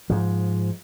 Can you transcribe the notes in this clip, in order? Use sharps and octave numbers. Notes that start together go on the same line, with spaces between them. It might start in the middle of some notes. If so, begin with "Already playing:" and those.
G#2 F3